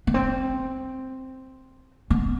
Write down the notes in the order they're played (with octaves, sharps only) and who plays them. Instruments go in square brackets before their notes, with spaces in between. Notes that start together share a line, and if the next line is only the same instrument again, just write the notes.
[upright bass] B3
C4
B3